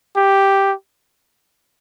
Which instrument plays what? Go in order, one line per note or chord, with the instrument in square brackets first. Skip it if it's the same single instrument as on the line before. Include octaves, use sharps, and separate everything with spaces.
[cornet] G4